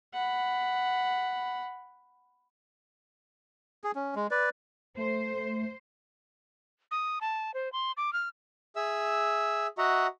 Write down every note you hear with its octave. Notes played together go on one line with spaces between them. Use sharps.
F#5 B5
G#4
C#4
G#3
B4 D5
A3 C5
D#6
A5
C5
C6
D6
F6
G#4 E5 E6
F#4 D#5 E5 F#5 A#5